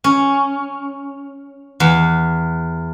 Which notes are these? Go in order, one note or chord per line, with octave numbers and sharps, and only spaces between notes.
C#4
E2